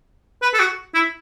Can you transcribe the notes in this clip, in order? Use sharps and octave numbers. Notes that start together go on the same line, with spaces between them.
B4
A4
F#4
E4